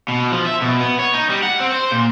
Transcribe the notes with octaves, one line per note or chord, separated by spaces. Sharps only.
B2
F3
E5
B2
B3
C#5
D#4
G3
F#5
C4
C5
A#2